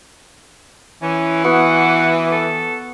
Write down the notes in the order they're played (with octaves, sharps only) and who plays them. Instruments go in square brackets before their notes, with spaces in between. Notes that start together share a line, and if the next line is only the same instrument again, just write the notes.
[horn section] E3 [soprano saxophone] C#4
[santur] B3 F#4 [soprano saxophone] F#5
[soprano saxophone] A4